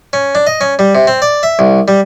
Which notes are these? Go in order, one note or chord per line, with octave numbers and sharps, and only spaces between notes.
C#4
D4
D#5
C#4
G3
C3
C4
D5
E5
C2
G3